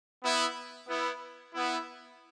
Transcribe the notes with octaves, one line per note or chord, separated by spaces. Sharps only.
B3 E4
B3 E4
B3 E4